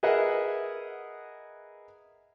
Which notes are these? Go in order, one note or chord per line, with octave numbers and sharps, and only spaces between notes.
G#4 A#4 B4 D#5 E5 F#5